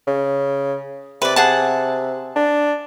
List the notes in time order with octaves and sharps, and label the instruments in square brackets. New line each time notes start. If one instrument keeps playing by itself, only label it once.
[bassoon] C#3
[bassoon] C3 [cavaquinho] B4 D5
[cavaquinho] G#4 F#5 A5
[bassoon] D4